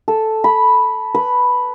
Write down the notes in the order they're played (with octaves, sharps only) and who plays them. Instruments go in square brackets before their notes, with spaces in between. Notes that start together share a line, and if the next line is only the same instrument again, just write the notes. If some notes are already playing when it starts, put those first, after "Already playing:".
[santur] A4
B5
B4